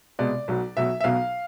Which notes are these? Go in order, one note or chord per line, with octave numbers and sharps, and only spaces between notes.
C2 B2 G#3 D5
B1 B2 F#3
B1 B2 F#3 E5
E5
B1 B2 F#3 F5